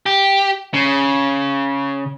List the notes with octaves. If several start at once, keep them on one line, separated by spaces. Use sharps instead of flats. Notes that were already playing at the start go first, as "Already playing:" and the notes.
G4
C#3